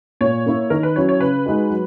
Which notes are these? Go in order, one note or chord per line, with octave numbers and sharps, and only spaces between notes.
A#2 C#5
A#3 E4
D#3 A#4
B4
F#3 C#4 E4 C#5
C#5
C#3 B4
G#3 D#4 F#4
F#3